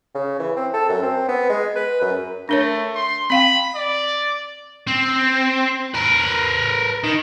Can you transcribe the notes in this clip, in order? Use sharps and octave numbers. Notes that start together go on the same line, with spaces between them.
C#3
E3
C4
A4
F#2
C4
B3
G#3
B4
F#2
A3 D4 A#4 C#5
C6
C4 F5 G5 B5
D5
C4
A#4 B4
D#3